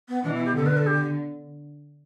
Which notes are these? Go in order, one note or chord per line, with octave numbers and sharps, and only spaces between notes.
B3
B2 E3 D4
E4
G4
D3 A4
B4
A4
G4